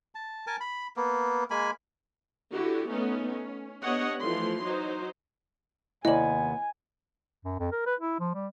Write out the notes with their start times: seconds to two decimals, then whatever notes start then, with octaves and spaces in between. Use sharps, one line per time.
0.15 A5
0.47 A#4 G#5 A5
0.60 B5
0.96 A#3 B3
1.50 G#3 A#3 G#5 B5
2.52 D3 E4 F#4 G4
2.89 A3 B3 C#4 D#4
3.29 C#4
3.81 B3 D4 G4 C#5 D#5 F#5
4.20 E3 F3 A3 C6
4.62 F#3 D#4 C5
6.05 D#2 C3 B3 E4 D5 D#5 G#5 F#7
7.45 F#2
7.59 F2
7.72 A#4
7.86 B4
8.00 E4
8.20 F3
8.35 G3